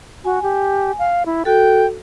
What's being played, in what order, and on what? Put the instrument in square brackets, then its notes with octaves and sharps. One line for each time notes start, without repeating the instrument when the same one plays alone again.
[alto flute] F#4 [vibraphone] G#5
[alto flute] G4
F5
E4
[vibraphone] F#4 A4 [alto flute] G5